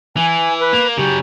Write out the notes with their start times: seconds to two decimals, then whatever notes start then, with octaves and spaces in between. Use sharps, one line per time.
0.17 E3 G#5
0.60 B4
0.73 A#3
0.97 C#3 F#3 G4